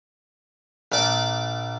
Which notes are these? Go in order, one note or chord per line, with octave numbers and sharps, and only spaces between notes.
A#1 A#2 D5 D6